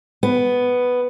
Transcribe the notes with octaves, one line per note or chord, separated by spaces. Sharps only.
B3